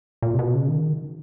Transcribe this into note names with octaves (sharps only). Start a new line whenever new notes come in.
A#2
C3
B2
C#3
D#3